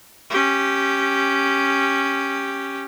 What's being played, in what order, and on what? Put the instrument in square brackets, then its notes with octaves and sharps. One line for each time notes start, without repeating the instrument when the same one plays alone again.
[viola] C#4 G4